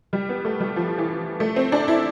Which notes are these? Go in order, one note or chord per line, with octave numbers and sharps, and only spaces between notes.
G3
B3
A3
G3
F3
E3
A3
C4
D4
E4